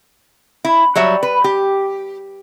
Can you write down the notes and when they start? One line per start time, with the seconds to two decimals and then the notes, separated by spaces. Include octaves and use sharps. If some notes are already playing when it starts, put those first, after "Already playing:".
0.64 E4
0.95 F#3 G3 C#5 E5
1.23 B4
1.44 G4